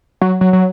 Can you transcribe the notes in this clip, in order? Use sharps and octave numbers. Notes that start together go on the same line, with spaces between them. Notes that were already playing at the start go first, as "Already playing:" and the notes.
F#3
F#3
F#3